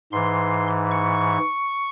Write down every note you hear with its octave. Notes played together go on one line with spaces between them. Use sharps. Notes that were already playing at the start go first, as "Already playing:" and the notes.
G#2 E3 C6
C#6